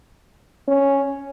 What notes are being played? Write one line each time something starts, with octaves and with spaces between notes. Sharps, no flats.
C#4